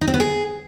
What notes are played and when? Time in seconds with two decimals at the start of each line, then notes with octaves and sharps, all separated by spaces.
0.01 D#4
0.08 C4
0.14 B3
0.20 G#4